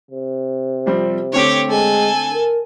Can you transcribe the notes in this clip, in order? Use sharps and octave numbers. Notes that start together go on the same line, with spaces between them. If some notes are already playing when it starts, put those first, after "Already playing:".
C3
F3 G3 C4
D3 A3 C4 G4 C#5
G#3 A4 G#5
A#4